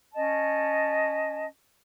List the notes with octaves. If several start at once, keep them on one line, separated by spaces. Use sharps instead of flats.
C#4 D#5 A5